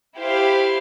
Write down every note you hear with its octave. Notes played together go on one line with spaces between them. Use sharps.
E4 G4 C5 F5